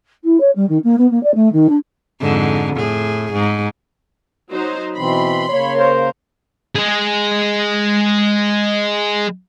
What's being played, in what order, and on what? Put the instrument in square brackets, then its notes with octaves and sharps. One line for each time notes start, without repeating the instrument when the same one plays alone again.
[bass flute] E4
C#5
G3
D#3
A#3
B3
A#3
D5
A3
D#3
D4
[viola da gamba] F2 G#2 D3
A2 G#4
G#2
[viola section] F#3 D#4 C5
[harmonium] B2 E3 C4 [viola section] B5 C6
[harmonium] C#3 A#3 [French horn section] C#5
[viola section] A#4 [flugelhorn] C5
[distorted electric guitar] G#3 G#4